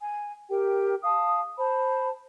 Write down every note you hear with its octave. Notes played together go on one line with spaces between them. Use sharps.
G#5
G4 A#4 G5
F5 A5 D#6
C5 A5 B5